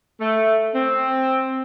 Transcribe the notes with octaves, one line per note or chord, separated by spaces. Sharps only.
A3
C4